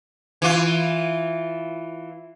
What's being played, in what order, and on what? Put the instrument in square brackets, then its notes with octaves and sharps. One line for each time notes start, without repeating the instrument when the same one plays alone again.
[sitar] E3 F4